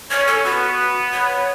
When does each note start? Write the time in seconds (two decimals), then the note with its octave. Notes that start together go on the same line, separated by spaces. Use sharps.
0.11 C#4 C#5
0.27 A4
0.44 B3 F#4
1.13 C#5